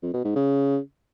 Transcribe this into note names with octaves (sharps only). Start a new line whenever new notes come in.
F2
B2
G#2
C#3